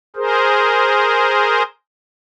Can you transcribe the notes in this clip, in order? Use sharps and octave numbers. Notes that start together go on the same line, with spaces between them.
G#4 A#4 C5